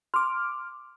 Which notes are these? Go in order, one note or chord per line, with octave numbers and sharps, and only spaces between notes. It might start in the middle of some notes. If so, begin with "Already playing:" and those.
C6 D6 F6